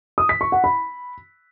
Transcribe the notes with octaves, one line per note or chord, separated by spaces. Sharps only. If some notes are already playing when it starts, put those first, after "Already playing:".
D#6
B6
C#6
F#5
B5